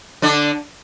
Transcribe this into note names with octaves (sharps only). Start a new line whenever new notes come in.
D3 D4